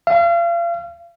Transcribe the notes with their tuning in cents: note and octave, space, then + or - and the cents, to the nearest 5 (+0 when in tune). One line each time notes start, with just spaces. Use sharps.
F5 -35